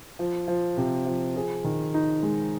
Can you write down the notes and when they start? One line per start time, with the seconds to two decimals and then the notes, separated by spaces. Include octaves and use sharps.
0.19 F3
0.48 F3
0.77 C3
1.06 F3
1.36 G#4
1.64 D#3
1.94 D#4
2.23 G#3